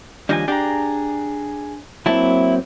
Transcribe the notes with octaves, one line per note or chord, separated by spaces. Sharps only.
D#2 F3 G3 D4 D#5 G#5
D4 G4 G#4 A#5
F#3 A#3 C4 E4 A5